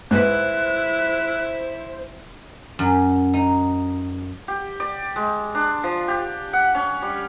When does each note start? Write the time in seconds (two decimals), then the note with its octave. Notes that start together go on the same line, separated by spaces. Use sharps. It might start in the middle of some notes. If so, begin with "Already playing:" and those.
0.11 G#2 E4 B4 C5 F#6
2.79 F#2
3.34 D#4
4.48 G4
4.80 D5
5.16 G#3
5.55 D4
5.83 F3
6.08 G4
6.53 F#5
6.75 C#4
7.02 G3